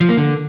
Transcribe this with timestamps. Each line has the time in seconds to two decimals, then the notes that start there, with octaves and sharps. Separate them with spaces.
0.01 F3
0.09 A#3
0.17 D3